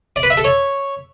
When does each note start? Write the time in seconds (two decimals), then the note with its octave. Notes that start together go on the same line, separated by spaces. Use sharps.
0.16 D5
0.23 B4
0.30 E5
0.37 A4
0.44 C#5